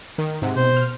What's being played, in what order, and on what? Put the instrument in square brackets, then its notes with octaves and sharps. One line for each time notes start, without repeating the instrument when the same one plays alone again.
[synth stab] D#3
[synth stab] G#2 C3 [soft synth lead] F#5
[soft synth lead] B2 [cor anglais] C5
[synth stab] F6